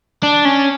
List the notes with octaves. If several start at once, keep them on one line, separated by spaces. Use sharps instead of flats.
D4
C#4